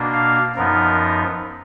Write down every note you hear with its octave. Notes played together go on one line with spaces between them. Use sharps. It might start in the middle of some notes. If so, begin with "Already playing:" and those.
Already playing: B2 A#3 D4
F5
F#2 F3 B3 D#4 A#4